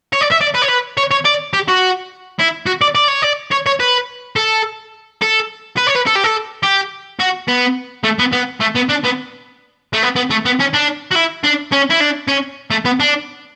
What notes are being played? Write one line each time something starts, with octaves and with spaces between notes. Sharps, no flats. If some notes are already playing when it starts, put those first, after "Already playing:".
C#5
D5
E5
D5
B4
C#5
B4
C#5
C#5
D5
G4
F#4
E4
F#4
D5
D5
C#5
D5
C#5
C#5
B4
A4
A4
B4
C#5
B4
A4
G4
A4
G4
F#4
B3
A3
B3
B3
A3
B3
D4
B3
A3
B3
B3
A3
B3
C#4
D4
F#4
E4
D4
C#4
E4
D4
C#4
A3
B3
D4